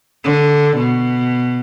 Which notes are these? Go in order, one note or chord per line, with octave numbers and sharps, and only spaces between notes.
D3
B2